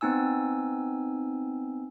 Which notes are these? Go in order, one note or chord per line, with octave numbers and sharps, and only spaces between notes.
B3 C4 D#4 G#5 E6